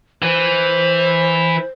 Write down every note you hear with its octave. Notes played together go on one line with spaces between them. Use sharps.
E3 C5